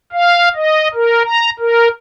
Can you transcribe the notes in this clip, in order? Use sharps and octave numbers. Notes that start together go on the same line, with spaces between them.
F5
D#5
A#4
A#5
A#4